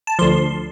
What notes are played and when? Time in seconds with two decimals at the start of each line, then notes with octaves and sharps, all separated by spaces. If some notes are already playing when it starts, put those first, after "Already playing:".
0.07 A5
0.19 D2 D3 F3 C6